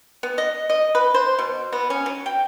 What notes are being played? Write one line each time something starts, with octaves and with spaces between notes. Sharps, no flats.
B3
D#5
D#5
B4
C5
B2
B3
C#4
F#3
G5